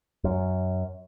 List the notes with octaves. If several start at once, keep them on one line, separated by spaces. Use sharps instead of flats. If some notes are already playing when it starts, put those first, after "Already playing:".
F#2